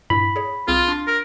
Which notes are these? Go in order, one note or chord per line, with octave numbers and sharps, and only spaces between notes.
G2 A#2 E4 B5
G#4 C#5
C2 C4 F4 G#4
D4 C6 A6
A#4